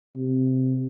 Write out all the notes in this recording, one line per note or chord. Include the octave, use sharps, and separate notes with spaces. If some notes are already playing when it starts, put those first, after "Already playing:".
C3